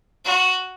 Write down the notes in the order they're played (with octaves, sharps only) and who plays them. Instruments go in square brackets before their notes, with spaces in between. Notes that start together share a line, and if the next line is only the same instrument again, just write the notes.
[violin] F#4